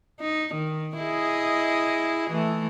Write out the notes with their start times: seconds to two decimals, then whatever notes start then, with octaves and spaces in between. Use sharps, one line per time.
0.20 D#4
0.54 D#3
0.98 E4 G#4 D#5
2.30 E3 A3